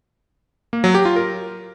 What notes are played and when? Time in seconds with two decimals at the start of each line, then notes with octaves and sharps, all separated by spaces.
0.73 A#3
0.84 F#3
0.95 G4
1.05 F4
1.16 A#4